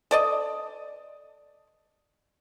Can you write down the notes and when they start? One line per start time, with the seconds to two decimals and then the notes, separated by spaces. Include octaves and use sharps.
0.11 A4 D5 D#5